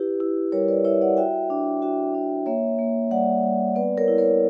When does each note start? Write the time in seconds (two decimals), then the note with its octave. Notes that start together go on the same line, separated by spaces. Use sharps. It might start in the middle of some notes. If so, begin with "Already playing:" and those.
Already playing: E4 G4 B4
0.20 E4
0.52 G3 A#4 C#5
0.68 B4 D5
0.84 E4 C#5 E5
1.01 D5 F#5
1.17 F#4 E5 G5
1.50 D4
1.82 F#4 E5 G5
2.14 D4
2.46 A#3 C#5 E5
2.79 A#3
3.11 G3 D5 F#5
3.43 G3
3.75 B3 B4 D5
3.97 A#4 C#5
4.08 E4
4.18 A#4 C#5